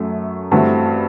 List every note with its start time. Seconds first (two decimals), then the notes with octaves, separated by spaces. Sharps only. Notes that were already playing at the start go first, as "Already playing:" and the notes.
Already playing: F#2 F#3 A3
0.52 G2 E3 A3 C4 F#4